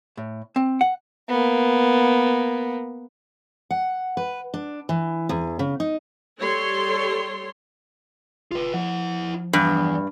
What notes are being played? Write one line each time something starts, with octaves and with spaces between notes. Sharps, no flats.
A2
C4
F#5
A#3 B3
F#5
B4
D4
E3
E2
C#3
D#4
G3 A4 C#5 C6
E1 F4 B4
F3 E4 F#5
E2 G2